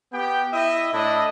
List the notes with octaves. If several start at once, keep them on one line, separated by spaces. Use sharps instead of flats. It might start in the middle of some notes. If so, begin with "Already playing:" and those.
B3 G4 G5
E4 D#5 E5
A2 D4 E4 D#5